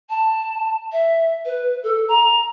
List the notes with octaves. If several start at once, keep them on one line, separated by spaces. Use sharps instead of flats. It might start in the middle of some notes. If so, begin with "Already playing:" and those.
A5
E5
B4
A4
A#5